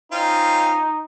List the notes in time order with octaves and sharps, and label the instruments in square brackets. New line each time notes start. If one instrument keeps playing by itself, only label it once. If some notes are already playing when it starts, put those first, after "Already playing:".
[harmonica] C4 C#4 F4 [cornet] D#4